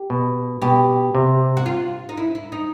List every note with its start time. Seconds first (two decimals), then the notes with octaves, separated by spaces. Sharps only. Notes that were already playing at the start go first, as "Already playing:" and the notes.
Already playing: G4
0.10 B2
0.62 B2 G4
1.15 C3
1.57 F#4
1.66 F4
2.09 D#4
2.17 E4
2.35 E4
2.52 D#4